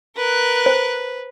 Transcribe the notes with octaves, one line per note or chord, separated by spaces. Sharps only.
A#4 B4 F#6
C5